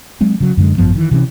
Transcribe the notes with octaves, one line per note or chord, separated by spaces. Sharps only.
F#3 G#3 C4
C#3 F#3
F#2 D3 G#3
G#1 F#2 F3 B3
D#3 E3
C3 E3 C4 C#4